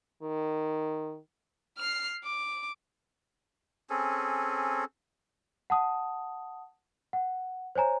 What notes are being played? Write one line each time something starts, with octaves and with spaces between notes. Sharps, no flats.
D#3
F6 C7
D6
C4 C#4 G#4 A4
F#5 A5 D#6
F#5
C5 C#5 G#5 A#5